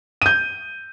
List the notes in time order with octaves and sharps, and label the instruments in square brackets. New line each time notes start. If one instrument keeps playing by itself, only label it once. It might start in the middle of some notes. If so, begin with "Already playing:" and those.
[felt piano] G6 D#7